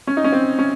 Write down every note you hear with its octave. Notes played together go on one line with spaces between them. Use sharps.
C#4
D#4
C#4
C4
C#4